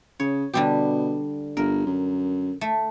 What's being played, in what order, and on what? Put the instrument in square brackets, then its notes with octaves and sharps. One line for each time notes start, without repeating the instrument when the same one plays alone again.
[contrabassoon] C#3 [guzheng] C#5
[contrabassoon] B2 [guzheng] D3 G3 G4
[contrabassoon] G1 [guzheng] A#4
[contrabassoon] F#2
[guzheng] A3